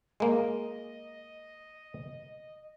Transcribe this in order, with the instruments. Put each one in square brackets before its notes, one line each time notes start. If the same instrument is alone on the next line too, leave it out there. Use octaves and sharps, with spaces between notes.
[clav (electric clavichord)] G#3 A#3 [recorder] D#5